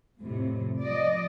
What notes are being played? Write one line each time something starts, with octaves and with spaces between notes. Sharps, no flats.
F2 A2 C3
F3 D5 D#5